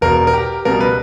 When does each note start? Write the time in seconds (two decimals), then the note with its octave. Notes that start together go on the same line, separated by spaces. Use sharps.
0.01 E1 E2 B2 A#4
0.27 A#4
0.33 G4
0.65 C#2 B2 G3 A#4
0.80 B4